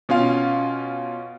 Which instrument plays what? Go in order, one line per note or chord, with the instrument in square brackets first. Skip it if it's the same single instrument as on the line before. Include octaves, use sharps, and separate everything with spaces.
[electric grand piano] B2 C#4 F4 F5